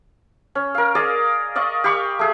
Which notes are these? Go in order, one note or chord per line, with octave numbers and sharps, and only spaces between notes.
C#4
A#4 F5
G#4 D5 D#5 F5
D5 D#5 F5 C#6
G4 F5 B5 C#6
A3 G#4